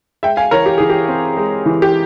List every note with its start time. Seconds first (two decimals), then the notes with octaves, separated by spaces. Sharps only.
0.23 G#3 E5 G5
0.37 F5 G#5
0.51 E3 A#4 C#5
0.66 G4
0.78 E3 G#4
0.90 G4
1.08 C4
1.37 G#3
1.66 E3
1.82 G4